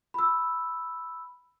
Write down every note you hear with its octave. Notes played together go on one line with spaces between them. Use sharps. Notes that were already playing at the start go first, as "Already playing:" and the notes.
B5 E6